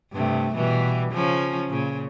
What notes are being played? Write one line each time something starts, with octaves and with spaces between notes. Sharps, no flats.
G2 C3 A3
B2 E3 G3
C#3 F3 C#4
A#2 C#3